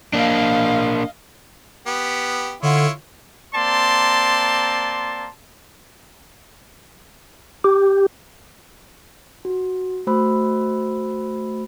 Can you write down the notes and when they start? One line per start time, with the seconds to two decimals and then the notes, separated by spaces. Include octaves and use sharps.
0.13 A#3 D4 D#5 F5
1.87 B3 G4
2.63 D3 E4 F4 C#5
3.55 A#3 C4 D5 A5 A#5 C6
7.64 G4
9.45 F#4
10.07 A3 F#4 C5 B5 E6